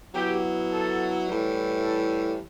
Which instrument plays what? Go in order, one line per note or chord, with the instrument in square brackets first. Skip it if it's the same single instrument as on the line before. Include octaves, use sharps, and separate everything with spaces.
[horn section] F#3 B3 E4 G4
A4
A2 E3 G3
A4